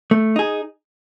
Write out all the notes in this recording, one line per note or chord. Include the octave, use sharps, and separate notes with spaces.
A3
D#4 G#4